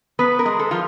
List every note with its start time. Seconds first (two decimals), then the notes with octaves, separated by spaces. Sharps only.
0.19 B3 B4
0.39 A#4
0.45 G#3
0.59 A4
0.71 F3 F4